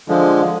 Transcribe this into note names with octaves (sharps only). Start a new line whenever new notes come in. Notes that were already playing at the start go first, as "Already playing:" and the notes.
D3 F3 G#3